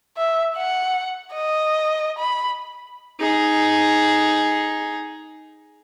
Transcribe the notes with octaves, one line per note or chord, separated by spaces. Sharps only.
E5
F#5
D#5
B5
D#4 G#4